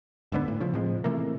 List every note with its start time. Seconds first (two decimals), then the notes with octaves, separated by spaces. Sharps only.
0.32 D#1 G#2 D3 B3
0.48 A2
0.60 C#3 F3
0.73 A2 C3 F3 G#3
1.04 C3 E3 A3 A#3